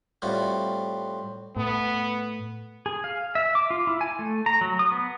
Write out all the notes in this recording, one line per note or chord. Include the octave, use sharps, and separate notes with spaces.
A2 G3 C4 F4 F#4
A2 B3
G#4
F5
E5
D6
F4
E4
G#5
A3
A#5
F#3
D#6
B3